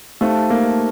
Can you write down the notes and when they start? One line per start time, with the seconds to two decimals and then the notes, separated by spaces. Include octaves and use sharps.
0.21 A3 D#4 G4 C5 F5 A5
0.50 A#3